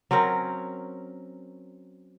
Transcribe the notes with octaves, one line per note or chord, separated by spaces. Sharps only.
F#3 C4 C#4 A#4